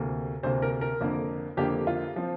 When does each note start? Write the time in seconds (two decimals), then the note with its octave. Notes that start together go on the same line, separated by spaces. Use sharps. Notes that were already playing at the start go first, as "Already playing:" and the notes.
Already playing: D2 C3 A#3
0.43 D2 C3 A#3 C5
0.62 A#4
0.81 A#4
1.01 F2 D3 A#3
1.57 F2 D3 A#3 G4
1.87 F4
2.16 F3 C4